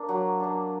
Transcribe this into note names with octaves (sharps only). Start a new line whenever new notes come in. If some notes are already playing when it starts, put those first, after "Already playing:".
Already playing: A#3 D4
F#3
A#3 D4